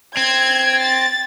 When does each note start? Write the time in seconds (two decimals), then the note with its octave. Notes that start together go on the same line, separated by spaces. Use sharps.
0.17 C4 G#6
0.81 A6